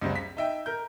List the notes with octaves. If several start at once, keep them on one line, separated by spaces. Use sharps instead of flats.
C#2 F#2 G3 C4
B6
D#4 E5 G5
A#4 G6